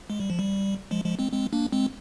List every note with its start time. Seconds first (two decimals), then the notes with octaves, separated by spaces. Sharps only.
0.10 G#3
0.20 G3
0.30 F3
0.39 G3
0.91 F3 G#3
1.05 F3 G#3
1.19 G#3 C4
1.32 G#3 C4
1.53 A#3 D4
1.72 G#3 C4